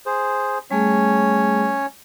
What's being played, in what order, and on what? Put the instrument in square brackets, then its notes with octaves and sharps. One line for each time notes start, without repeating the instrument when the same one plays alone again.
[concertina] G#4 C5
[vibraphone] G3 A3 G#4 [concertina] C#4 C#5